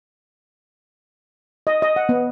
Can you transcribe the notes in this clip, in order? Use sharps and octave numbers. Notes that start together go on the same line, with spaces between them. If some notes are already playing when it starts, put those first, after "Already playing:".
D#5
D#5
F#5
B3